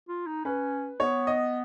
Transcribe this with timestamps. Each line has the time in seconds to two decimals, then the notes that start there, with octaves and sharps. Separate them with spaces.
0.09 F4
0.26 D#4
0.45 C#4 B4
1.00 B3 C#5
1.27 D#5